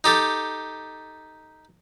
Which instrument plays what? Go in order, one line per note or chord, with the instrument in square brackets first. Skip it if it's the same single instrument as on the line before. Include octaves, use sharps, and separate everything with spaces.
[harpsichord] D#4 G4 A4